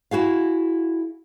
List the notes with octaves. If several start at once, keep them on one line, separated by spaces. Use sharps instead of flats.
E4 F#4 G#4 F5